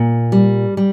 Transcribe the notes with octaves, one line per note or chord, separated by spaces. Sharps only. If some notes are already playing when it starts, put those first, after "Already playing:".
Already playing: A#2
G3
G3